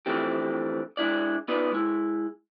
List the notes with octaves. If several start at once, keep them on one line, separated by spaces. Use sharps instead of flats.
D3 E3 F3 A3 C4 G4
G#3 D4 E4 D5
B3 D#4 F4 B4 D5
G#3 E4